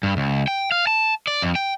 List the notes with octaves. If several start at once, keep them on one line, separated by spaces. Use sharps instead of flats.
G2
C#2
G5
F5
A5
D5
F2
G5